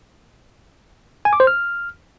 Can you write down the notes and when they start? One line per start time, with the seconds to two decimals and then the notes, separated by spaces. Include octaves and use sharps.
1.25 G#5
1.33 D6
1.40 C5
1.47 F6